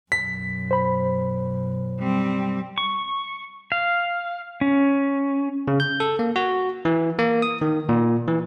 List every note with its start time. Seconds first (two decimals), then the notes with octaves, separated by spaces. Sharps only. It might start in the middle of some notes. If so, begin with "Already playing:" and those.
0.12 B1 F#2 B6
0.71 C5 B5
1.99 G3 C4
2.78 C#6
3.72 F5
4.61 C#4
5.68 C#3
5.80 G6
6.00 A4
6.19 A#3
6.36 F#4
6.85 E3
7.19 A#3
7.42 D#6
7.61 D#3
7.89 A#2
8.28 E3